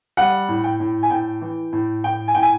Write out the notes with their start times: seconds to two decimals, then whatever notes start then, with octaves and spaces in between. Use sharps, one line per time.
0.17 G3 F#5
0.48 A2
0.64 G5
0.80 A2
1.03 G#5
1.10 A2 G5
1.41 E3
1.73 A2
2.04 A2 G5
2.28 G#5
2.35 A2 G5
2.42 G#5